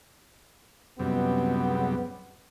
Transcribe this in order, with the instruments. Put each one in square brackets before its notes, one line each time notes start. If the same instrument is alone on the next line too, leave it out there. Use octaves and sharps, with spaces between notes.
[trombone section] C#2 B3 [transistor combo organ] F#2 C3 G3